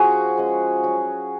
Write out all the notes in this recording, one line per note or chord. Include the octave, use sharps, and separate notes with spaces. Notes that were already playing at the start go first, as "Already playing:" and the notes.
Already playing: F3 C#4 F#4 G#4
G#3 C#4
F#3